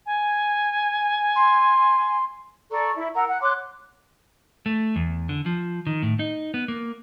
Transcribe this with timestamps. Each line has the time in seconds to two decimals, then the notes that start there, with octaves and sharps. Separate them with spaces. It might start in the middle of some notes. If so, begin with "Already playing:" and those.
0.05 G#5
1.36 C6
2.71 A4 D5 A#5 C#6
2.95 E4
3.15 A#4 F#5 A#5 E6
3.28 F#5 F#6
3.42 C#5 C6 D6 F#6
4.66 A3
4.96 E2
5.29 D3
5.46 F3
5.87 D#3
6.03 A2
6.19 D#4
6.54 B3
6.68 A#3